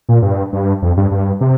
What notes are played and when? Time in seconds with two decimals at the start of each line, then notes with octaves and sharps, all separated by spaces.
0.09 A#2
0.22 G2
0.53 G2
0.82 F2
0.97 G2
1.11 G2
1.41 C3